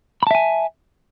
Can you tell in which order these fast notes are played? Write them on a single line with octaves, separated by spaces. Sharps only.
B5 A5 E5 G#5